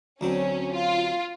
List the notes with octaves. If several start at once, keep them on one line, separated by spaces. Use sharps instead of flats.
D2 F#3 C4 C#4
F4